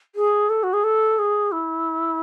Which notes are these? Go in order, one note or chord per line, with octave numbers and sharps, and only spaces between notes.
G#4
A4
F#4
G#4
A4
G#4
E4